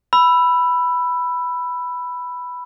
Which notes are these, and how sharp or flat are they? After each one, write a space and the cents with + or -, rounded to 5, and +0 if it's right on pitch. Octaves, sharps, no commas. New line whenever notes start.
B5 +0 E6 +15